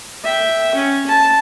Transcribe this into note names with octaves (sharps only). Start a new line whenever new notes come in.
E5 G5
C#4
A5